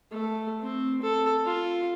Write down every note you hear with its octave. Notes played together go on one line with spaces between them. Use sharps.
A3
C4
A4
F4